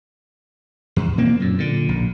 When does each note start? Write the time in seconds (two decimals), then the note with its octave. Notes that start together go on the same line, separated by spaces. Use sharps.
0.96 E2
1.18 B2 A#3 C4
1.40 F#2 A#2
1.58 A#2 D3
1.89 A#1